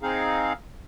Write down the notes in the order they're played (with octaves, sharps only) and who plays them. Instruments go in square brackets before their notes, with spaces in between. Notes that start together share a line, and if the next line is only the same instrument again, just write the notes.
[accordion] C4 D#4 G#4 F5